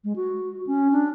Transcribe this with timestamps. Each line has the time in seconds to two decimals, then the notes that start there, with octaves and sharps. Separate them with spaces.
0.04 G#3
0.16 F#4
0.67 C#4
0.92 D4